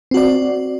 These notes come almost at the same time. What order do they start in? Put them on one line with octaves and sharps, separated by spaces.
C4 F#4 D5